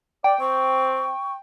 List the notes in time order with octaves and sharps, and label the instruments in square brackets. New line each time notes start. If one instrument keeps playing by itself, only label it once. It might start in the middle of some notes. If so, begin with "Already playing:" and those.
[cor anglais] D5 [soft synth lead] G5
[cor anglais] C4 [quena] C#6